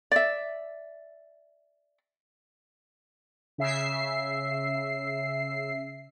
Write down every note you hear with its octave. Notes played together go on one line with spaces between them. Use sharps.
D5 E5
C#3 E5 C7